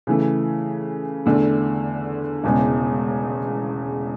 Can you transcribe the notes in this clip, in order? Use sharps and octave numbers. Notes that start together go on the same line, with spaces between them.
C#3 E3 A3
E2 D3 A3
E1 E2 C#3 G#3